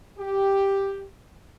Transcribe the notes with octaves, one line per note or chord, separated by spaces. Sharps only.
G4